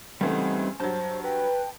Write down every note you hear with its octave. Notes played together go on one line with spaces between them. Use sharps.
C#2 E3 G3 A3 C4 D#4 F#5
G2 F#3 C5 A5 G6
B4 G5